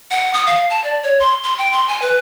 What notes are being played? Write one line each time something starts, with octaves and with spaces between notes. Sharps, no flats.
F#5
D#6
F5
A5
D5
C#5
C6
C6
G5
C6
G#5
B4